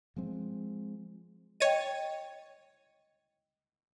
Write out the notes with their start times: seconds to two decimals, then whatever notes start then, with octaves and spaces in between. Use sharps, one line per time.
0.16 F3 G#3 C4
1.60 C#5 D#5 G5 A6 D#7